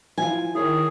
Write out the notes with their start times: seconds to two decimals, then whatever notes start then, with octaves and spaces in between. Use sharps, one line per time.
0.18 F3 E4 F4 G#5
0.55 D#3 E4 G#4 C#5